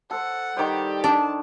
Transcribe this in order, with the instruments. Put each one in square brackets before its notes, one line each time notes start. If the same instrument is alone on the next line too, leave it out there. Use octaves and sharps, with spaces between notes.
[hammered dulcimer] A4 C5 [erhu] F#5
[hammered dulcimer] D#3 C5 [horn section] G3 G4
[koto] D4 [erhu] A5